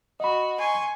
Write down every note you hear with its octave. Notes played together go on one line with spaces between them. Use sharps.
F#4 D#5 B5
G#5 C6 C#6